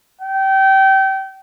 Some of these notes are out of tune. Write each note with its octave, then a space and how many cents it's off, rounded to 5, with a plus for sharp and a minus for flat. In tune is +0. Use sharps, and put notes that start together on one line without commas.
G5 -25